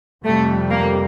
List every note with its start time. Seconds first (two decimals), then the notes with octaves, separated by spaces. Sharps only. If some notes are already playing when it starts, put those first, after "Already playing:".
0.25 F2 C3 G3 A3
0.70 A#3